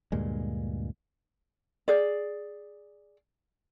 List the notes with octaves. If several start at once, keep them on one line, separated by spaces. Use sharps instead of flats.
D2 G2 A#2 G#3
G#4 D5